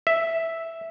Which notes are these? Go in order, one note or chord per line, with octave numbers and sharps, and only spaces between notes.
E5